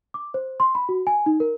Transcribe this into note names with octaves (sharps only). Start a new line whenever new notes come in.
D6
C5
C6
B5
F#4
G#5
D#4
A#4